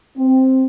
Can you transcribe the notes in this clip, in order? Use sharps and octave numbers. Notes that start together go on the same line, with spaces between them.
C4